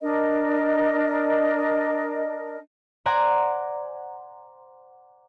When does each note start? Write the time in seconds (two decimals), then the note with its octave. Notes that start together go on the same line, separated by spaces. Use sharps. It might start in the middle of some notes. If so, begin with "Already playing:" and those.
0.02 D4 A#4 D#5
3.06 C5 D5 F#5 G#5 A#5 D6